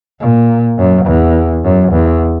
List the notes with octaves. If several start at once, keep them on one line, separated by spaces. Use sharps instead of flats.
A#2
F#2
E2
F#2
E2